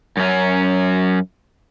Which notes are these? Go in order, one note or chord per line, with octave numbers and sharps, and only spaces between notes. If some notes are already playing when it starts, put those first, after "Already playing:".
F#2 C#4